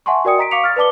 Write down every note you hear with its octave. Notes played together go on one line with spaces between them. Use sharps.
E5 F#5 G#5 A5 C6 C#6
F#4 A#4 D5 G5 D#6 C#7
D#5 A#5 B6 D7
F5 C#6 D6 B6 C#7 F7
F6 A6
B4 D5 A5 D6 G7